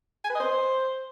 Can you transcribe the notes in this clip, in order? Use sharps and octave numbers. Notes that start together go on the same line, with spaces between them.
G#5
B4
D#5
C5